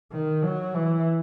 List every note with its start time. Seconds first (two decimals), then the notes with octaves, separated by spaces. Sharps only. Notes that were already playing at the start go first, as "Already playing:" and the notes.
0.12 D#3
0.43 F#3
0.74 E3